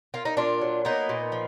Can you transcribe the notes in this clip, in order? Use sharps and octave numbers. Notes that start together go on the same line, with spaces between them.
A#3 F4
D#4
A#2 D4 F4
F#3
A#3 B3 D#4
A#2
F3